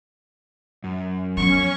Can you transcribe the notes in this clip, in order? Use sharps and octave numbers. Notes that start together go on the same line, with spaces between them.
F#2
F3 B3 C#4 C#6